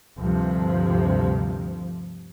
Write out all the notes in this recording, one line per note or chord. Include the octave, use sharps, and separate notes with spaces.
D2 G2 C3 F3